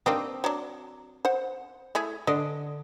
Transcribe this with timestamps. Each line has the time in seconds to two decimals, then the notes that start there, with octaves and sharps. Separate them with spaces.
0.06 A#3 C4 D4 D#4 G4
0.44 F#3 D4
1.25 C5 F#5
1.95 A3 E4 G#4
2.27 D3 D4 D#5